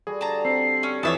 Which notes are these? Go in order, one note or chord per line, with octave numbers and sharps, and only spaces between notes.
G3 F#4 G#4 A4
D3 A5 A#5
G3 C4 C7
C#4
F2 E3 E4 C#5 E5 A5 D#6